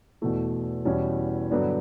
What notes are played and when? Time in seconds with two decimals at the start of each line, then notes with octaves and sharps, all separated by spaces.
0.21 E2 B2 A3 E4
0.85 E2 B2 G3 C#4 E4
1.51 G2 D3 F#3 B3 D4